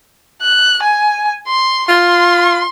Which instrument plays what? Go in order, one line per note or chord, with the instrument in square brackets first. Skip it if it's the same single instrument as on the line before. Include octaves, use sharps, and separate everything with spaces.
[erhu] F#6
G#5
C6
[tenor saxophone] F4 [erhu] C6